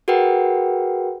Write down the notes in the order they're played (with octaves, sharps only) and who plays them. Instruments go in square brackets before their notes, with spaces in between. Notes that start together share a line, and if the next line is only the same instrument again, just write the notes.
[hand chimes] F#4 G#4 A#4 B4 F#5 G5